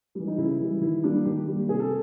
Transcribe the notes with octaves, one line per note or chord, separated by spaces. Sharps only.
E3 G3
D#4
C#3 E4
E3 G3
D#3 E4
G3 A#3 D4
D#3 G4
G3 A#3
C3 G#4
A4